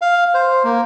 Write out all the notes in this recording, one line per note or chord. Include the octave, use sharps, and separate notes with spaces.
F5
C5
A#3